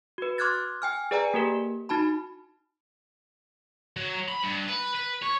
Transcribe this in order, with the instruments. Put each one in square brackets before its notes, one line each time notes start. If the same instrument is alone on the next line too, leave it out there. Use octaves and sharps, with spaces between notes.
[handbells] F#4 B4
C6 D6 F6 F#6 G#6 A6
G5 G#5 F6
G#4 B4 D5 G5 G#5 A#5
A#3 G4 A#4
D#4 F#4 A5 B5
[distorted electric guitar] F#3
B5
G2
B4
B4
C#5